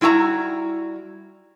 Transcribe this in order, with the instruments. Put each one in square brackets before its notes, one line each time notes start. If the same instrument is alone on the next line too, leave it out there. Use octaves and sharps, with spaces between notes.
[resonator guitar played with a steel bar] G3 E4 F#4 G5 A#5